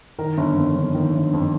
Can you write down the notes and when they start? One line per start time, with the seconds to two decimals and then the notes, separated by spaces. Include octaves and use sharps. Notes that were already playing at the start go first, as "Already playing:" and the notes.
0.19 D#3 A#4
0.37 G1
0.56 F2
0.76 G1
0.95 D#3
1.14 G1
1.33 F2